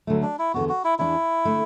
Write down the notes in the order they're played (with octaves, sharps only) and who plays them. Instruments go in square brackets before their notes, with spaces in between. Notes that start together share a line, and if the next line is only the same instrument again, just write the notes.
[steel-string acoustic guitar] D2 D3 F#3 A3
[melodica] D4
E4
[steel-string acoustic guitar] E2 D3 B3 [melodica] F#4
[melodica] F#4
E4
[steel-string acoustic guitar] E2 E3 D4 [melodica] E4
[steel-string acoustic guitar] D3 A3